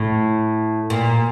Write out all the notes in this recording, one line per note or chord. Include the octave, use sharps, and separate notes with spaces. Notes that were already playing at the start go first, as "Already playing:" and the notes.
Already playing: A2
A#2